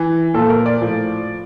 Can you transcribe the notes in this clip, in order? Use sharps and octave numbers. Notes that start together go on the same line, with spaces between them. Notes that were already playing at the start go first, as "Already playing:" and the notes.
Already playing: E3
A#2 F3 A4
A#4
D5
A2 F3